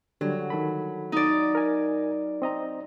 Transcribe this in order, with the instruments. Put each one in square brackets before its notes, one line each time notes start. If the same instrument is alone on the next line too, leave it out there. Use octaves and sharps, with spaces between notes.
[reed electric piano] D3 G3 [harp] F#3
[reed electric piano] D#3 A4 B5
[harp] D#4 D5
[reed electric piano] A#4 G#5
C4 D#5 A#5